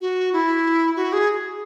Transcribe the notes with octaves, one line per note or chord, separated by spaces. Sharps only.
F#4
E4
F#4
G#4